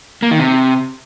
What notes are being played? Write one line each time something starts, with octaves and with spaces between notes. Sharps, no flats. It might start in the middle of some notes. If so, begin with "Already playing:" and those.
A#3
D#3
C3